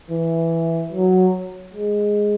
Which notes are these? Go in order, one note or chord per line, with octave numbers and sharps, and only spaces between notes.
E3
F#3
G#3